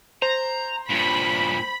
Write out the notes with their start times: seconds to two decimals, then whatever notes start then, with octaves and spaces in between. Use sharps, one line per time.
0.22 C5 A#5
0.90 G2 A#2 B5